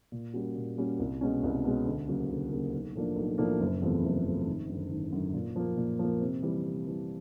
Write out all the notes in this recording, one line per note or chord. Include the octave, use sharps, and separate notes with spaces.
A#2
G3 A#3 C#4 F#4
A#2
G3 A#3 C#4 F#4
C2
B2 G#3 C#4
C2
B2 G#3 C#4
D2
C#3 F#3 A#3
D2
C#3 F#3 A#3
B1
A2 F3 A#3 D4
B1
A2 F3 A#3 D4
F#1
E2 C3 F3 A3
F#1
E2 C3 F3 A3
G#1
F#2 D3
G#1
F#2 D3
A#2
F3 A#3
A#2
F3 A#3
C3
E3 G3
C3
E3 G3